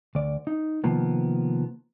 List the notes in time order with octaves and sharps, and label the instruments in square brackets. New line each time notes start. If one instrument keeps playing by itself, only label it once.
[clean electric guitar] D2 D5
D#4
C3 D#3 F3 A#3 B3